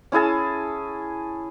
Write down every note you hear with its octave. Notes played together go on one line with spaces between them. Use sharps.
C#4 E4 G#4 A5